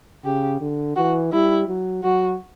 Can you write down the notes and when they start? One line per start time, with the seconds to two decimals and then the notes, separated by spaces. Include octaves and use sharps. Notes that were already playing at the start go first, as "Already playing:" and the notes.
0.25 C#3 G4
0.61 D3
0.96 E3 F#4
1.32 G3 E4
1.68 F#3
2.03 F#3 F#4